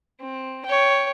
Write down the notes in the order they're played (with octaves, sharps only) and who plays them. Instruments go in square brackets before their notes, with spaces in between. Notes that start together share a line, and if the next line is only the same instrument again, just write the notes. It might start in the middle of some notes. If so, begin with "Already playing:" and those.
[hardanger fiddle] C4
C#5 G5